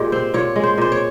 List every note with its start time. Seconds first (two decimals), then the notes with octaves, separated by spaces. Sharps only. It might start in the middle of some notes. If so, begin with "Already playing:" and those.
Already playing: A#2 G#3 G4
0.12 C4 C5
0.34 A#2 C#5
0.56 G#3
0.63 C5
0.78 A#2 C5
0.92 C#5